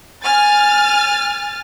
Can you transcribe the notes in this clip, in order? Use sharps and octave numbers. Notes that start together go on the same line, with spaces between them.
G#5 F6 A6